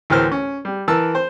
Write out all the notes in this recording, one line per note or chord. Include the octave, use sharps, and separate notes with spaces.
D2 A2 E3 A#4 C5 F6
C#4
G3
E3 A#4 A5 E6
C5